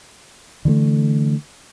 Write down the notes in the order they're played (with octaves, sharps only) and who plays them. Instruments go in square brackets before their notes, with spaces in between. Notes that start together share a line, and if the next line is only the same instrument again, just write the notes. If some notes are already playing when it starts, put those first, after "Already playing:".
[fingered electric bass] D3 E3 G3 A3